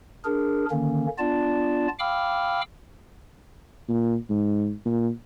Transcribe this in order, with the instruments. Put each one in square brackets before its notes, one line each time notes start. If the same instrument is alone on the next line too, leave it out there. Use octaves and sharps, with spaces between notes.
[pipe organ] D4 G#4 A#4
D3 D#3 A#3 C#4
B3 D4 F4 D5 A5
F5 G5 B5 D6 E6 F6
[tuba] A#2
G#2
A#2